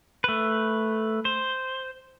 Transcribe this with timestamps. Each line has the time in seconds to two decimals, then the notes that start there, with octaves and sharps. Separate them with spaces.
0.24 A3 B4
1.25 C5